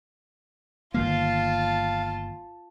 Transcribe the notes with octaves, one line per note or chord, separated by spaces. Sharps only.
G1 D#3 A#3 F4 F5 A5